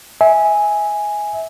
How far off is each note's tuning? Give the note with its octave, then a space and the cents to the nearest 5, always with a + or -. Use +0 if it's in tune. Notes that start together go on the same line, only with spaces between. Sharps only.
E5 -25 G#5 +0